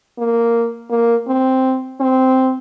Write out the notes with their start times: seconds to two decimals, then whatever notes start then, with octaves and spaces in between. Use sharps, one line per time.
0.19 A#3
0.91 A#3
1.28 C4
2.01 C4